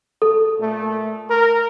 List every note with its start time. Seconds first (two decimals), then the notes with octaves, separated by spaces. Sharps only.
0.22 A4
0.59 A#2 A3
1.29 A#4